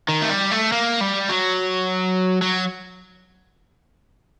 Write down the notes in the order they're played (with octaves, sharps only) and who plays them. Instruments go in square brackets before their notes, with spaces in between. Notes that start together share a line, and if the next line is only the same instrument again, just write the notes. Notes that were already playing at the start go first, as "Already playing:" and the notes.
[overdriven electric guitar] D#3
A3
G3
A3
A#3
G3
F#3
F#3